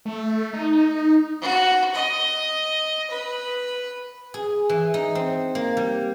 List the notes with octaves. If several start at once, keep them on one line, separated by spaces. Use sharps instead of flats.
A3
D#4
F#4
D#5
B4
G#4
E3
D#4
C4
A#3
G3